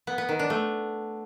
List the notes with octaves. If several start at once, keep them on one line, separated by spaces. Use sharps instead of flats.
B3
B3
D#3
D4
A3